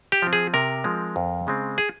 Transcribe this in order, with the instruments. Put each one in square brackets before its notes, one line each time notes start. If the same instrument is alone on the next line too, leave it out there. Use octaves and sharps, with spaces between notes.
[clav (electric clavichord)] G4
F3 C4
G#4
C3 A#4
F3 G#3 C4
F2
C#3 G#3 C4
G#4